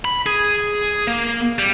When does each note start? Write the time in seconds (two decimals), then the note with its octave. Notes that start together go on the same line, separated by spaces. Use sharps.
0.05 B5
0.26 G#4
1.07 A#3
1.59 G3